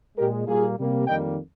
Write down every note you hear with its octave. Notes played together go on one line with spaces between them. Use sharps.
A#2 G#3 G4 A#4
A#2 G3 A#3 F4 G#4
C3 G3 A#3
F2 D#3 G3 A#3 D#5 G5